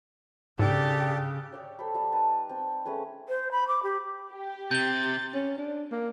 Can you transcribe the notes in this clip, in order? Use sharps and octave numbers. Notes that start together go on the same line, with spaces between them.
G#2 C#3 D4 G4 A4
C#5 D5 G5
A4 C5 D#5 B5
G3 F5
D#4 B4 A5 A#5
C4 G5
A3 C#4 G#4 B4
C5
B5
D6
G4
G4
C3 G6 A6 G7
C#4
D4
A#3